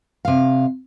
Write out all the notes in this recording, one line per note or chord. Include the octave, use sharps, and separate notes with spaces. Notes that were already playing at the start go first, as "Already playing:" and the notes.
C3 F5